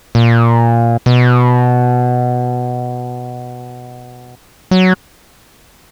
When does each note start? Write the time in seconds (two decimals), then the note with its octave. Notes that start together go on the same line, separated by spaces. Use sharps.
0.15 A#2
1.06 B2
4.71 F#3